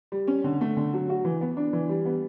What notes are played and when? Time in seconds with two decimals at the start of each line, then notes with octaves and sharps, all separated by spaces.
0.12 G3
0.28 C#4
0.44 D3
0.61 A3
0.77 D3
0.93 F#3
1.09 F#4
1.25 E3
1.41 B3
1.57 D4
1.73 E3
1.89 G3
2.05 B3